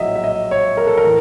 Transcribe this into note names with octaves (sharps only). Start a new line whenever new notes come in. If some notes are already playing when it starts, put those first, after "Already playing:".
Already playing: A#1 A2 F#3 D#5 E5
E5
D#5
C#5
A#4
A4
A#4
A2 E3